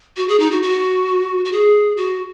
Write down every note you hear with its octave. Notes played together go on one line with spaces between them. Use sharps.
F#4
G#4
D#4
F#4
F#4
F#4
G#4
F#4